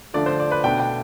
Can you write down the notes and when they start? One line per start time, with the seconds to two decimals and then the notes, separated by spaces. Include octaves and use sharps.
0.14 D3 F3 A3 D4 D5
0.26 C5
0.40 D5
0.51 B4
0.64 B2 A3 D4 G5
0.80 G5